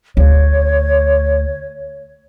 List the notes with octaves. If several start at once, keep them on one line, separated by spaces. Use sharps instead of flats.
D2 C#5